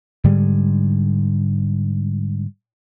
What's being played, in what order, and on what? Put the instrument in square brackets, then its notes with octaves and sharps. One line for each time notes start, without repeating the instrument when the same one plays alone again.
[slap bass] G#2 D3 G3 G#3